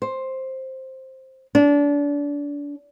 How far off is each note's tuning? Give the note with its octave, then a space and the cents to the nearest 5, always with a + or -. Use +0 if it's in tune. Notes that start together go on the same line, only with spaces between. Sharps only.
C5 +10
D4 -30